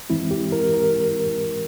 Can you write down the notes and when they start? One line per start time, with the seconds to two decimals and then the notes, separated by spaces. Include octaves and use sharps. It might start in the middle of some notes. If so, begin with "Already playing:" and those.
0.10 G2 E3 G#3 C4 E4
0.31 G4
0.52 A#4
0.74 A#4